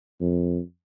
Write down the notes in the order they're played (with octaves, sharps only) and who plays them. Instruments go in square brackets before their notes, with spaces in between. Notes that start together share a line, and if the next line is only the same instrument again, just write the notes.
[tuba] F2